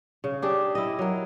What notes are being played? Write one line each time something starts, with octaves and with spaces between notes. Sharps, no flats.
C#3
D4 G4 G#4
E4 D#5
F#3 A#4